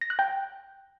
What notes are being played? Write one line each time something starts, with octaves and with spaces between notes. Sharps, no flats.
A#6
F#6
G5